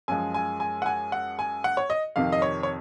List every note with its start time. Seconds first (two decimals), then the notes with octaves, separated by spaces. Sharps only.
0.08 F#2 F3 G#3 G#5
0.34 G#5
0.60 G#5
0.82 F#5
0.86 G#5
1.12 F#5
1.39 G#5
1.64 F#5
1.77 C#5
1.90 D#5
2.16 F2 C3 D#3 F5
2.32 D#5
2.42 C#5
2.63 C#5